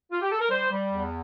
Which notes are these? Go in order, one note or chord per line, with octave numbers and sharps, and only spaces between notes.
F4
G4
A4
A#4
G3 C5
G3
E2